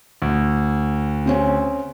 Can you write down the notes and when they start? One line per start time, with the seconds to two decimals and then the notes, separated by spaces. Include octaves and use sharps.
0.22 D2
1.26 C#3 C4 C#4